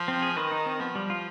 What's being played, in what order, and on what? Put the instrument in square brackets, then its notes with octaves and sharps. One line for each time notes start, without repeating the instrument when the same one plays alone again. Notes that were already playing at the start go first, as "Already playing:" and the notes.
Already playing: [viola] F3
[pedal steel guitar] C4
G#4
[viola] D#3 [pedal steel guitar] B4
[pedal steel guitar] D#4
C4
[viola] F3 [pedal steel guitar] B3
[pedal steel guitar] G3
F4